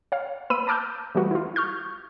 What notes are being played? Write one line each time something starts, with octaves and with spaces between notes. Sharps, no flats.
C#5 F5
A#3 B4 B5 E6 D#7
A5 A#5 D6 E6 F6 G6
E3 G3 A3 A#3 F#4 B4
E4 F4
C#6 F6 G6